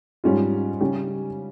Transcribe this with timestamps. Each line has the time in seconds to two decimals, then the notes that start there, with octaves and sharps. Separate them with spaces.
0.24 G#2 G3 C#4 F4
0.81 C#3 G3 C#4 G4